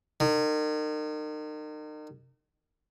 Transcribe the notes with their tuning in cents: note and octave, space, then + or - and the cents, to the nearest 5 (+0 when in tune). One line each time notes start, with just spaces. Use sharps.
D#3 -35